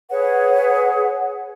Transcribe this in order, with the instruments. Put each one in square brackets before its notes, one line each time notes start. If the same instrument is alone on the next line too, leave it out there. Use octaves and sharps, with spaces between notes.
[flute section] G#4 B4 C#5 F#5